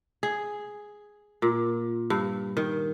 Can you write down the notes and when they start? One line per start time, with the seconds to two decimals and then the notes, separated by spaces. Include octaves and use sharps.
0.23 G#4
1.42 A#2
2.10 G2
2.57 D#3